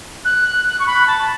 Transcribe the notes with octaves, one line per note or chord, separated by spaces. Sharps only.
F#6
C#6
B5
A5